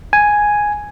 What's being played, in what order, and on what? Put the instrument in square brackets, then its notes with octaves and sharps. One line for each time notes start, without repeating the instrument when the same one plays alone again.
[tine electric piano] G#5